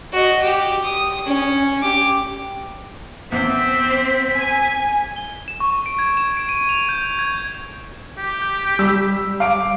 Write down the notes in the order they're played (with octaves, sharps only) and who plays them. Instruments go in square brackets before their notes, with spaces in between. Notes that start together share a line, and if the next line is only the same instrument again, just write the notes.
[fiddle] F#4 D#5
G4
D#6
C#4
G4 D6
[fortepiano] E2 [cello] C4 [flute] B6
[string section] G#5
[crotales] G7
E7
C#6
D7
G#6
E7
D7
D#7
F7
G6
G#6
[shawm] G4
[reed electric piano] G6
[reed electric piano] G3 [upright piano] E6 B6
[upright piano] F5 D7 [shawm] D6